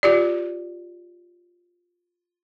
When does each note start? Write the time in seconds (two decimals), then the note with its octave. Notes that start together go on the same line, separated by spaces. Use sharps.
0.03 F4 G4 D5